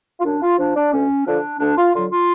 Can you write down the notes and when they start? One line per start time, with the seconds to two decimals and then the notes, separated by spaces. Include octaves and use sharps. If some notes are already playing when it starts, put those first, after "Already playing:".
0.20 F4
0.24 F#2 D4
0.42 F4
0.58 F3 D4
0.76 D4
0.93 D2 C#4
1.26 D3 F3 D4
1.60 D2 D4
1.77 F4
1.94 D3 F#3 F4
2.11 F4